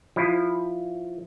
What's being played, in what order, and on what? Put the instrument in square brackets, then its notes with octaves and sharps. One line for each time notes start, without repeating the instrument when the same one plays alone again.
[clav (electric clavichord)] F3 E4